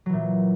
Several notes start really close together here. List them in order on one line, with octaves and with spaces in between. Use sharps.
F#3 E3 A#2